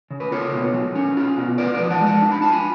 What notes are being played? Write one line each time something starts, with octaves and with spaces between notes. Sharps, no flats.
C#3
B4
F4 A4 C#5
B2
F#3
C#4
F4
B2
F4 B4 D5
B4 D5
F3
F#5 A5
G#3
F#5 A5
D4
B5
F4 A5
G#5 B5